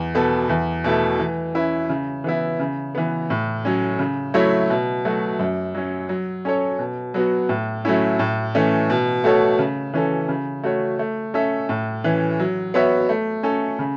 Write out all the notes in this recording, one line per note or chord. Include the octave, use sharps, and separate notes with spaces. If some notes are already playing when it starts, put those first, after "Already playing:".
Already playing: E2
B2 B3 A4
E2
B2 A3 E4 A4
E3
C#4 E4 B4
C#3
E3 B3 E4
C#3
E3 B3
A2
F#3 C#4
C#3
F#3 A3 E4 C#5
B2
F#3 A3 F#4
F#2
F#3 C#4
F#3
C#4 A4 C#5
B2
F#3 B3 F#4
A2
F#3 A3 C#4 E4
A2
E3 A3 C#4
B2
A3 F#4 A4 C#5
C#3
E3 C#4 A4
C#3
A3 F#4 C#5
A3
C#4 A4 E5
A2
E3 C#4
F#3
B3 F#4 C#5 E5
A3
C#4 A4
C#3